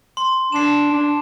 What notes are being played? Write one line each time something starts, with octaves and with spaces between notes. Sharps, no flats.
C6
D4 C7 E7
D4